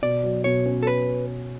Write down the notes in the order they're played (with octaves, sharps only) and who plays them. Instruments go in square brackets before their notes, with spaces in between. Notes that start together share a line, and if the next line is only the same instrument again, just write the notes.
[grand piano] B2 [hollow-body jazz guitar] D5
[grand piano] F#3
[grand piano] B2 [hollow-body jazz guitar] C#5
[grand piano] C#4
[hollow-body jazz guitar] A4
B4